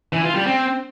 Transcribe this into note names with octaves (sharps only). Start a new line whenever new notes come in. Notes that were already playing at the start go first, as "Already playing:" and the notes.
E3
F4
G3
C4